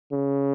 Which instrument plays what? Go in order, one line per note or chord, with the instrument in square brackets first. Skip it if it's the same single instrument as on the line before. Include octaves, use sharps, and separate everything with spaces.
[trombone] C#3